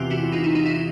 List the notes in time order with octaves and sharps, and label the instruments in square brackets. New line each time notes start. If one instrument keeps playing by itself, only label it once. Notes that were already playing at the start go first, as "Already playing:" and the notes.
Already playing: [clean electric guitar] E2 C3 E3 [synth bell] F4 G4
[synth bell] E4 F#4
D#4 F4
E4
D#4
E4